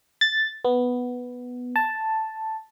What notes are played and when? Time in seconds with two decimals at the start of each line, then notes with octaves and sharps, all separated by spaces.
0.21 A6
0.65 B3
1.76 A5